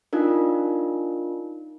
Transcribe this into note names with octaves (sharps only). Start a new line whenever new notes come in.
D4 D#4 F4 A#4